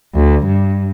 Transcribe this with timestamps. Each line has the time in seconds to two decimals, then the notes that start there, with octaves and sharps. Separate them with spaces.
0.15 D2
0.46 G2